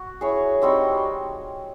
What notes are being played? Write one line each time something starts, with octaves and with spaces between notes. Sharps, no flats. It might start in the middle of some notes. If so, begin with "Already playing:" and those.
Already playing: F#4
E4 G#4 C#5
G3 C4 D#4 F#4